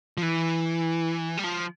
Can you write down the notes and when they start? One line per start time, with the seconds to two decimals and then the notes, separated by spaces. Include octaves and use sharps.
0.18 F3
0.23 E3
1.38 G3
1.44 F3